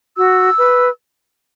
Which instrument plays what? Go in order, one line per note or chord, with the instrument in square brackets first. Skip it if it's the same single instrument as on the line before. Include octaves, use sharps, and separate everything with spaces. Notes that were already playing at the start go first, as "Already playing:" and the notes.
[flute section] F#4 E6
B4